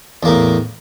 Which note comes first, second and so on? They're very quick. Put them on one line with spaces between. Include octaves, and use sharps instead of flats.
E2 A#3 A2